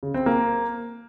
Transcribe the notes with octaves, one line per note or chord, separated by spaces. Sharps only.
C#3
C4
A#3